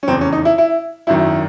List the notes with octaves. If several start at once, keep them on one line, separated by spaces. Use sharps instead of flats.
C#4
F1 E2 C#3 C4
C#4
D#4
E4
E4
G#1 F#2 D#3 E4